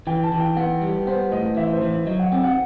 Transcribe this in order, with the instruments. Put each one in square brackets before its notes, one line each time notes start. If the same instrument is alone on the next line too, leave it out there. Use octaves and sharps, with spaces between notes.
[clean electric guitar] E3 [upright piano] G5
[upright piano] A5
[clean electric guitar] E3
[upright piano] G5
[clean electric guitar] B3 [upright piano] F#5
[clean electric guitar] G3
[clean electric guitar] B3 [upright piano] C5
[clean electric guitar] A2 [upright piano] D#5
[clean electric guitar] E3 [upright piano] E5
[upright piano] C5
[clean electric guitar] E3
[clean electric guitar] F#3 [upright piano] D#5
[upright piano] F#5
[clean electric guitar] C4 [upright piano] G5
[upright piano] F#5